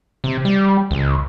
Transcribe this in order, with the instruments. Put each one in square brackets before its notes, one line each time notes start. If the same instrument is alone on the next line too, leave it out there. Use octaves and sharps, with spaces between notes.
[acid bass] C3
G3
C#2